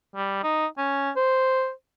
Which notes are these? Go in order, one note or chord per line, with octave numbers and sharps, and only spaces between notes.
G3
D#4
C#4
C5